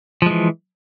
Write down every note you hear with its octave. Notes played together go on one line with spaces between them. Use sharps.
E3 F3 G#3